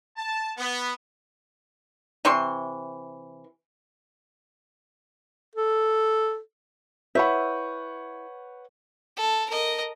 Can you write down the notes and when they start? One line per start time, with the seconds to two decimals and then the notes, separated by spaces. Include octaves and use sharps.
0.17 A5
0.57 B3
2.25 C3 E3 C6 C#6
5.56 A4
7.15 E4 B4 C#5 E5 F#5 B5 C#6 G6
9.17 A4
9.50 A#4 D#5